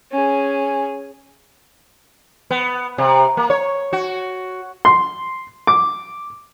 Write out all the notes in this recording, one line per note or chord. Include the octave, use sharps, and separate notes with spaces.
C#4 G#4
B3
C3
A#3
C#5
F#4
C6
D6